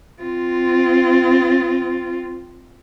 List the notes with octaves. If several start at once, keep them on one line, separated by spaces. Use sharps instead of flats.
C4 F4